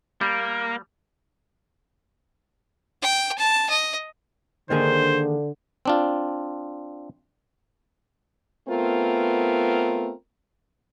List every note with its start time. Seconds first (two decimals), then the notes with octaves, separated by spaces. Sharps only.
0.21 G3 A#3
3.02 G5
3.38 A5
3.69 D#5
4.70 D3 D#3 A#3 G#4 C5
5.85 C4 D4 F4
8.69 A3 B3 C4 F4 A#4